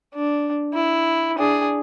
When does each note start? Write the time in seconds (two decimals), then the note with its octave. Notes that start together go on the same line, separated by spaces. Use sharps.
0.15 D4
0.74 E4
1.38 D4 G#4